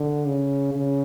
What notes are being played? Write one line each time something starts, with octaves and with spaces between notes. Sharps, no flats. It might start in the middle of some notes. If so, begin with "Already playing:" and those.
Already playing: D3
C#3
C#3